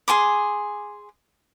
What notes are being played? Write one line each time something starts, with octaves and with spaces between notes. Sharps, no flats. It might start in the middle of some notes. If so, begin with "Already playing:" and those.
G#4 G#5 C6 D6